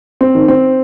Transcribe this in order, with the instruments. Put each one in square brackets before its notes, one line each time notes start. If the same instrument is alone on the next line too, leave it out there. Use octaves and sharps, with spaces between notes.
[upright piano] C4
D#3
C4